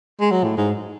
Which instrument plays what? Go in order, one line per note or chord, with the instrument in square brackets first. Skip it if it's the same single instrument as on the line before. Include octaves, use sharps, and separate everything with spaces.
[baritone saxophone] G#3
F#3
A2
G#2